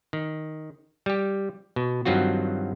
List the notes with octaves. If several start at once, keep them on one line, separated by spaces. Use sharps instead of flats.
D#3
G3 G4
B2
G2 D#3 F#3 C4 F4 F#4